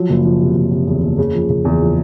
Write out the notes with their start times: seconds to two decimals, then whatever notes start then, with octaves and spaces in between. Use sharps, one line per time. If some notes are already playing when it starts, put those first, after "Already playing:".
Already playing: F3 F#3
0.10 F#1
0.24 F3
0.40 C3
0.56 F#1
0.72 C3
0.87 E2
1.03 F#1
1.18 C#3
1.35 F3
1.50 C#3
1.65 E2
1.81 F3